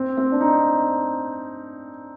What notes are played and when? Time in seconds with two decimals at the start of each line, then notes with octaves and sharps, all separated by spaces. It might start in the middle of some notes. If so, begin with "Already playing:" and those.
Already playing: C4
0.18 C4
0.32 D4
0.41 D#4